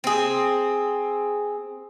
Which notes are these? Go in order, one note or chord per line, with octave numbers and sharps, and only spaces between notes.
C4 G#4